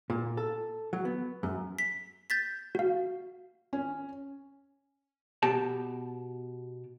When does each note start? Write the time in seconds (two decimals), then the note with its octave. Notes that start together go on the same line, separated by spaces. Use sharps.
0.10 A#2
0.37 A4
0.93 F#3
1.05 B3
1.43 F#2
1.79 B6
2.30 G6 A6 B6
2.75 F#4 F5
3.73 C#4
5.43 B2 G4 A5